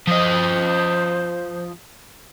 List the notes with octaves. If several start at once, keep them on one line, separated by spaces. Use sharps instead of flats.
F3 C5 D#5